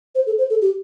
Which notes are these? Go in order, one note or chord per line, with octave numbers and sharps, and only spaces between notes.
C5
A4
C5
A4
G4